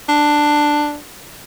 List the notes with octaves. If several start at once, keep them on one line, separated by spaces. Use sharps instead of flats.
D4